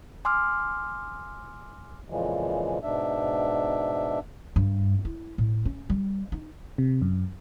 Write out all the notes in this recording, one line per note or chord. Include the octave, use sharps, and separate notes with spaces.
G#5 C6 D6 E6 F6
F2 A#2 C#3 E3 F3 G#3
G#2 B2 D4 E5
G2
E4
A2
C#4
G3
D#4
C3
F#2